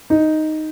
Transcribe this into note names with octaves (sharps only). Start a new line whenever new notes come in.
D#4